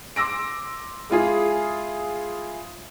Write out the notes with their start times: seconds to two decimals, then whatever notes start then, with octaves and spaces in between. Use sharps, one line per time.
0.16 C6 D6 E6 A#6 D7
1.10 G#3 E4 F4 G#4